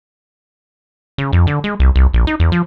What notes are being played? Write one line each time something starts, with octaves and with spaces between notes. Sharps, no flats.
C#3
F2
D3
G#3
C2
C2
A#1
D#4
E2
F3